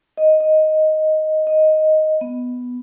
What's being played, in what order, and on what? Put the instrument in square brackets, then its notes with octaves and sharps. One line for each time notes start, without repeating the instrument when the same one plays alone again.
[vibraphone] D#5
D#5
D#5
B3